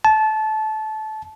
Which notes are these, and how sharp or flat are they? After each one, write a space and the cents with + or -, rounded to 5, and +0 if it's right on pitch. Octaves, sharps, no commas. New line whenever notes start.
A5 -20